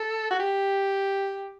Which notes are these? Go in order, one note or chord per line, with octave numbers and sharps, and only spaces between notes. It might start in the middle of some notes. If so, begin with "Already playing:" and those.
Already playing: A4
F#4
G4